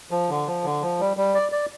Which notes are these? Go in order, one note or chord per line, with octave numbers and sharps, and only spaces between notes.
F3
D3
F3
D3
F3
G3
G3
D5
D5